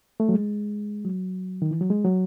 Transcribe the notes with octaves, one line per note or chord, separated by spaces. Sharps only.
A3
F#3
G#3
F#3
D#3
E3
F#3
G#3
F#3